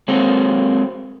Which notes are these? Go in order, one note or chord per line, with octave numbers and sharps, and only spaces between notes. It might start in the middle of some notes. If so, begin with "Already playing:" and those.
F#3 G#3 A#3 C4 A4